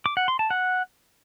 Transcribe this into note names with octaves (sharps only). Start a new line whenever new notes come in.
D6
F#5
C6
A5
F#5